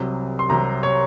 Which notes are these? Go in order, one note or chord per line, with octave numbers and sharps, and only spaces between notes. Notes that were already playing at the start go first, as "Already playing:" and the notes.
Already playing: C2 C3 F#3
C6
C2 C3 F#3 A#5
C#5